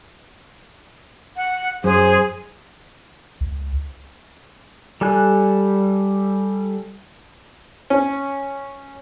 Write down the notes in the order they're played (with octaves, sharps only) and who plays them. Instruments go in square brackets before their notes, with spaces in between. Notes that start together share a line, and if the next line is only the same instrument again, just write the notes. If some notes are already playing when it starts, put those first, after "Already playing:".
[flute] F#5
[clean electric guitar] F#2 [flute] G#4 [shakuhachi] C5
[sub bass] C#2
[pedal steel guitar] G3 A4 G#5 F#6
[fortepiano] C#4